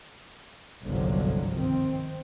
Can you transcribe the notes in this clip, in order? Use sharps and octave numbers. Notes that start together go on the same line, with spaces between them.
G1 C2 G#2 D3 F3 F#3
D#3 C4